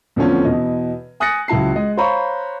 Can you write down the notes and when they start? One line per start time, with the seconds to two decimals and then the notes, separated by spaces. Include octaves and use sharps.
0.16 E2 D3 F3 A3 C4 C#4
0.45 E2 B2 D#5
1.20 G#5 D#6 F#6 A6 A#6 C#7
1.48 C#2 F#3 E4 A5 C7
1.76 G#3 D#5
1.97 C5 C#5 F5 A#5 B5 C#6